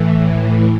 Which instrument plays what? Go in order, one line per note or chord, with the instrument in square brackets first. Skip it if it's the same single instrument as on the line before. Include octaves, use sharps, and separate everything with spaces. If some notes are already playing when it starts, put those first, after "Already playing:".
Already playing: [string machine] A2 E3